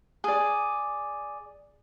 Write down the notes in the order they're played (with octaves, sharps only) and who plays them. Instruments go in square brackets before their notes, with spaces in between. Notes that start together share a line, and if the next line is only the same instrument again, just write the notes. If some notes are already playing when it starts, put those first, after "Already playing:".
[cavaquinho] G#4 D5